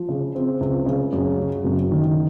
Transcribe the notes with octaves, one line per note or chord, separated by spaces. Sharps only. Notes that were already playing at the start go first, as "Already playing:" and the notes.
Already playing: F3
C#3
C4
C#2
C#3
F#2
F#3
F#1
D#3